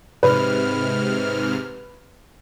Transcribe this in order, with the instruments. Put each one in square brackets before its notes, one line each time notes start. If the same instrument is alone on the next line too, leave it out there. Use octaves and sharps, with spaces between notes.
[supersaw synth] G#2 C3 F6 [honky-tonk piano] B4